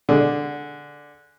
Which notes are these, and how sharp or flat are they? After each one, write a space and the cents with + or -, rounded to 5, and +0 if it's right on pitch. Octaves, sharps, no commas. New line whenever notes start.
D3 +0 G#4 +0